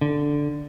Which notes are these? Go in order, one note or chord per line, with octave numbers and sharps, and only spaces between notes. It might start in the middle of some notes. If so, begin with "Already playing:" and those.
D3